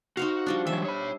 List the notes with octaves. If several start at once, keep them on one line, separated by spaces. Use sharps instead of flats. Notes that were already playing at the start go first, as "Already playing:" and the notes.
D#4 F#4 C5 F5
F3 G3 D4
E3 F#3 E5
C#5 B5